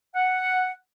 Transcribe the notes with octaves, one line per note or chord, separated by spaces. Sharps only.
F#5